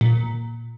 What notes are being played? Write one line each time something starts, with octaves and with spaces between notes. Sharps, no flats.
A#2